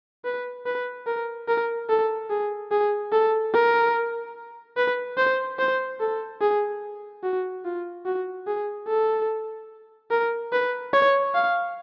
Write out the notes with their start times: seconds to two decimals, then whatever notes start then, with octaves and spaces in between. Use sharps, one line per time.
0.25 B4
0.66 B4
1.07 A#4
1.48 A#4
1.89 A4
2.30 G#4
2.71 G#4
3.12 A4
3.53 A#4
4.77 B4
5.17 C5
5.59 C5
6.00 A4
6.41 G#4
7.23 F#4
7.65 F4
8.05 F#4
8.47 G#4
8.88 A4
10.11 A#4
10.52 B4
10.93 C#5
11.35 F5